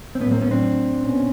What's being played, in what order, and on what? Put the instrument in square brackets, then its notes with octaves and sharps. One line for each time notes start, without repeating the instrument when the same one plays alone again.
[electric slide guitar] C4
[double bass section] A2 F#3 A3 [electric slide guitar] B3 C#4
[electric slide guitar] A#3 C4
B3 C#4
C4 D4
[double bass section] B2 C#4